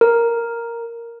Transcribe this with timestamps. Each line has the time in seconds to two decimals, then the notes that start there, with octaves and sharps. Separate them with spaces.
0.01 A#4